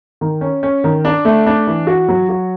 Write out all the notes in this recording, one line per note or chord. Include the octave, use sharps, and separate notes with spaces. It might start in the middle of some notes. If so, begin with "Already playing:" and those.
D#3
C#4
C#4
D#3
D4
A3
D4
E3
F#4
F#3
F#4